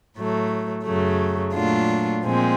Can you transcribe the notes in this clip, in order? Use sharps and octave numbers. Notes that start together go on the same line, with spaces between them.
A2 F#3 A3
F#2 C#3 F#3 A3
A#2 F#3 A3 D4 F4
A#2 F3 G#3 C4